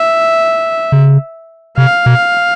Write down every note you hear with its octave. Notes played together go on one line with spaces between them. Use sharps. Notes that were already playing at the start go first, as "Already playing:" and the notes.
Already playing: E5
C#3
C3 F5
B2